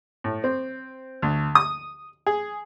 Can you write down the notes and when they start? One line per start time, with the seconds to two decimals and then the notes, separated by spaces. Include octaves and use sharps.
0.24 A2
0.44 C4
1.22 D2
1.55 D#6
2.26 G#4